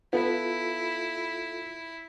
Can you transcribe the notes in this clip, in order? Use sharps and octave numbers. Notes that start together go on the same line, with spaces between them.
B3 E4 F4 A4